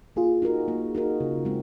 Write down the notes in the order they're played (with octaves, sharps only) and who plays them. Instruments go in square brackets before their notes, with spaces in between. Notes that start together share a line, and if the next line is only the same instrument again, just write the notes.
[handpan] A#3 [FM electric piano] F4 G#4
[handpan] D#4 F#4 A#4
A#3
D#4 F#4 A#4
C#3
G#3 C4